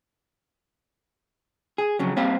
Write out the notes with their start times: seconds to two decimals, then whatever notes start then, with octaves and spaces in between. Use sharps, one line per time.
1.78 G#4
1.99 F2 C#3 F#3
2.16 G3 A#3 C4 G4 C5 F5